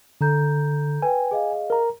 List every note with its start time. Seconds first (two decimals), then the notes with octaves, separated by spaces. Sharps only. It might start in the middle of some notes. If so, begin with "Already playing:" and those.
0.21 D3 A4 A#5 G6
1.02 B4 G5 G#5
1.31 G#4 D#5 F5
1.70 A#4 A#5